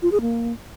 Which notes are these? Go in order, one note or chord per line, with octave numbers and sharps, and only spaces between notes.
F4
G#4
A#3